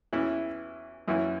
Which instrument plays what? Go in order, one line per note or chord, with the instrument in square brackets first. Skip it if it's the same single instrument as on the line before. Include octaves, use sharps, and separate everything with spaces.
[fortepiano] E2 E3 C#4 E4
F#2 E3 C#4 E4